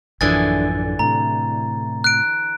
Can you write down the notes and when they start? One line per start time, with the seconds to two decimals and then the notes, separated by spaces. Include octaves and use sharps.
0.21 A1 F#2 D3 E3 F3 G#4 A6
0.99 A2 C3 A#5
2.04 F#6 D7